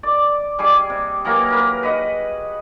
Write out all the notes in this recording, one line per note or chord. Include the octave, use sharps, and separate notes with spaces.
D5
G3 G#4 D6
C3
E3 F#3 A#3 A#4
A#4 B4
B4 D#5 F#5